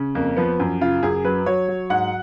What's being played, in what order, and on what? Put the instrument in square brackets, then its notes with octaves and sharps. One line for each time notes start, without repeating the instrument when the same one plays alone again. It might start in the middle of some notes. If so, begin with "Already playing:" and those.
Already playing: [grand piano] C#3
F2 A#3
F3 B3
F#2
C#3 F4
F#2 G#4
F#3 B4
F#3 C#5
F#3
G#2 F#5